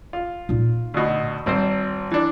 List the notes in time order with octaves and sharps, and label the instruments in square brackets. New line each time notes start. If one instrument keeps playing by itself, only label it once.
[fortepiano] F4
[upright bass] A#2 D#4
[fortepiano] D2 B2
[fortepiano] G#1 C4 C5 [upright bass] G3
[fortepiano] E3 D4